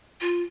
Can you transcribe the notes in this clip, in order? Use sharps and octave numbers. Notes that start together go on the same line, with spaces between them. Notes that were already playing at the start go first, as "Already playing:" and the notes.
F4